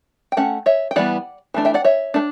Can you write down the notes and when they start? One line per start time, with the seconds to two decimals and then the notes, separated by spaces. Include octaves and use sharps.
0.32 G5
0.37 A3 C#4 F#5
0.66 C#5 E5
0.91 G5
0.96 E3 G3 B3 D5 F#5
1.54 E3 A3 D4
1.65 E5 G5
1.74 D5 F#5
1.84 C#5 E5
2.14 A3 D4